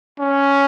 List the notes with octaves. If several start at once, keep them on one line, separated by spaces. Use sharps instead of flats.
C#4